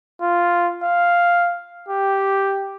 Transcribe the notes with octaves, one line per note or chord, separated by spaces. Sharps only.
F4
F5
G4